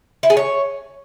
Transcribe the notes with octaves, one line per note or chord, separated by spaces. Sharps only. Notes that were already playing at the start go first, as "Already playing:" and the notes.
E4
G#4
C#5